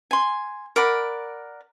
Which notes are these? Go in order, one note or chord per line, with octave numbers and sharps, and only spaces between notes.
G#5 C6
A#4 D5 F#5 B5